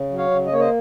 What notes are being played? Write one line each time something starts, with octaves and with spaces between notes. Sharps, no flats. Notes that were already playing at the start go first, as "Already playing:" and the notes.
Already playing: C#3
F#3
C#5 F5
C#3
D#5
A#3 C#5
C5 D#5